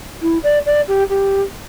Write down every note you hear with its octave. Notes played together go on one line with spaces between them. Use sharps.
E4
D5
D5
G4
G4